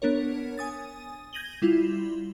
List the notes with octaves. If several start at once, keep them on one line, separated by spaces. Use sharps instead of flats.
B3 D4 A#4 C#5
G#5 D#6 A6
G6 G#6 A#6 D#7 F#7 G7
G3 E4 F4